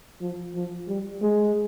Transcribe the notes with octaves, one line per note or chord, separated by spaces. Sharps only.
F3
F3
G3
G#3